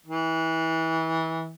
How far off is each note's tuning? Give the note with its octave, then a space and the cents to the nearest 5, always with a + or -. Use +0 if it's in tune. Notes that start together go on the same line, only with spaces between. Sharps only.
E3 -25